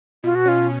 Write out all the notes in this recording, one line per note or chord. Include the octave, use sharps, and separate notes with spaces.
B2 F4
F#4
C#4 F4